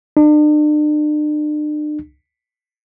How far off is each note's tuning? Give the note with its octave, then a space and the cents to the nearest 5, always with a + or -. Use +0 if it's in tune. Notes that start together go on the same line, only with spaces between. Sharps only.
D4 +40